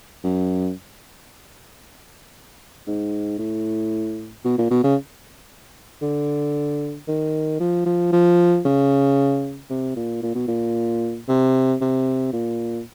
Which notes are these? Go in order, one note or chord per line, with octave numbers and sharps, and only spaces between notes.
F#2
G#2
A2
B2
A#2
B2
C#3
D3
D#3
F3
F3
F3
C#3
C3
A#2
A#2
B2
A#2
C3
C3
A#2